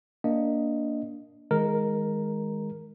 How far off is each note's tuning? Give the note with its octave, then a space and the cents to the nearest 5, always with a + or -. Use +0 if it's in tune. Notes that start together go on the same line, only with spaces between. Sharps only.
A#3 +0 D4 -15 D#5 +0
D#3 +30 G#3 +0 A#4 +0